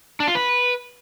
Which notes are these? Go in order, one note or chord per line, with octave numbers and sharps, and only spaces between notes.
D4
F4
B4